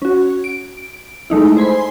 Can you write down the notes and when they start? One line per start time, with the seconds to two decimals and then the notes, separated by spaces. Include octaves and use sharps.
0.02 C#4 F#4
0.44 D7
1.30 G#3 A3 D#4 E4
1.57 C5 G#5 B5 C6